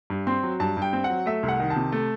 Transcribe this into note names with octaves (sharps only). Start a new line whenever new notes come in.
G2
C4 C6
F#3
G2 A5
G2
G5
C4
F#5
F#3
A3 E5
C2
F#5
D#3
A5
C3
A3